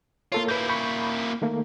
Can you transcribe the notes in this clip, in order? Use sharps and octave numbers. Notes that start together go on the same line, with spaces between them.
A#3 F4 A4 C#5
A#3 E4 B4 G6
B5 C#6 G6
D#3 A3 A#3